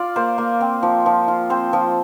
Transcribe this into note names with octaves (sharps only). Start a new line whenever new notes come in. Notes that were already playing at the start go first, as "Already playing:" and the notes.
Already playing: F4 D5
A#3 C5
A#3
C4
F3
F3
F4
C4 C5
F3